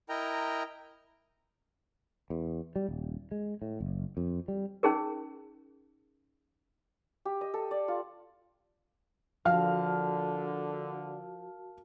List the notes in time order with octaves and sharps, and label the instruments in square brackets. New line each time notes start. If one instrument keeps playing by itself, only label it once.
[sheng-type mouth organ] E4 A#4 D#5 G5 A#5
[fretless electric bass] E2
G3
D#1
G#3
A2
F#1
F2
G3
[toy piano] C#4 D#4 G#4 A#4
[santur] G4
D#5
A4
D5
F4
[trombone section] D3 [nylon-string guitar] F3 [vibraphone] F#4 A#4 A5 [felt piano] F5 F6